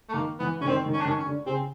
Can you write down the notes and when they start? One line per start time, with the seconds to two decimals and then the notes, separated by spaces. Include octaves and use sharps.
0.09 A3
0.13 D#3 A#3
0.39 E3 B3
0.61 D3 C#4
0.67 D#3 C4
0.86 D#3
0.93 C#4
1.01 D4
1.05 D#3
1.08 C#4
1.19 C#4
1.26 D3
1.46 C#3 C4